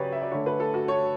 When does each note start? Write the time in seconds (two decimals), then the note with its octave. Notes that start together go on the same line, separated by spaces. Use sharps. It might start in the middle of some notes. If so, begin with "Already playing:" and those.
Already playing: C#3 F#3 G4 B4 C#5 D5
0.12 E5
0.22 D5
0.31 D3 A3 C#5
0.46 B4
0.60 A4
0.74 F#4
0.88 C#5